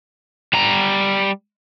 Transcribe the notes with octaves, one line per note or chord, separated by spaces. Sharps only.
G3 A#5